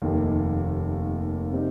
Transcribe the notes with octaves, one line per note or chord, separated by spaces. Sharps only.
F1 D#2 D#3
C3 G3 C4 D#4